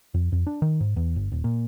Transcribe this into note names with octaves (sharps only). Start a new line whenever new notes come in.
F2
F2
D4
D#3
G#2
E2
G1
D#1
A#2